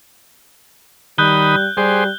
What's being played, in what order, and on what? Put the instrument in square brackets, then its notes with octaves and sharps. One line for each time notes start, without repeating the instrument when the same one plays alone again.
[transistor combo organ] D#3 B5 D#6 [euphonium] G3 [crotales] F#6 G6 G7
[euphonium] G3 [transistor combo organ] G4 G#4 C5